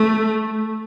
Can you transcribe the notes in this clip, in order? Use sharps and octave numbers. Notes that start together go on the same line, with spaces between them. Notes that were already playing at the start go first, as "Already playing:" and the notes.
Already playing: A3